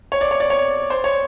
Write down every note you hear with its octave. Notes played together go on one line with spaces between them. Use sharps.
C#5
D5
C#5
D5
C#5
C5
C#5